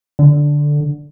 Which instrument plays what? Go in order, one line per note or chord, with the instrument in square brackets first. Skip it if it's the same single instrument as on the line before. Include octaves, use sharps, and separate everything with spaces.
[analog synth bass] D3